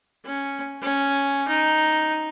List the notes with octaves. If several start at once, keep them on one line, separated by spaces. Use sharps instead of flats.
C#4
C#4
D#4